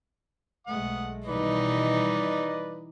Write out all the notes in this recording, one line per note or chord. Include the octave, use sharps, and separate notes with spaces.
B1 G#3 A3 F#5 D#6
B2 D#3 E3 G3 D#4 B4 D5 D#5